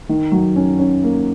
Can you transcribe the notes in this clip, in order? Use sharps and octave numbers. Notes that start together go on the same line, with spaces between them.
D#3
F#3
C#4
C#4
A#3